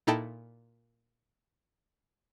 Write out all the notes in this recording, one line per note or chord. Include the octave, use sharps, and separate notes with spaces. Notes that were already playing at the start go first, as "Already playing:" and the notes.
A#2 D#4 E4 A4 G5 A5